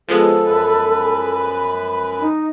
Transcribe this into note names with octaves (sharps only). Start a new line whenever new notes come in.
F3 G#3 B3 A4
F#2 B4
D#4